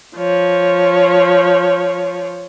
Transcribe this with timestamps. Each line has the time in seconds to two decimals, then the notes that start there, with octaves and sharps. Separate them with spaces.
0.16 F3 C#5